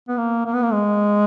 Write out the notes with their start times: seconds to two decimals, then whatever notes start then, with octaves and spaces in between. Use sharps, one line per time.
0.08 B3
0.18 A#3
0.46 A#3
0.54 B3
0.63 A#3
0.73 G#3